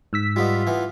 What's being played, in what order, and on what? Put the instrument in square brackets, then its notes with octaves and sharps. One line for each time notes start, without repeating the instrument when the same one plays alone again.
[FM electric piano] G#2 E6 B6
[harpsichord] G3 B3 D#4 [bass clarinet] F4
[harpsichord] E3 B3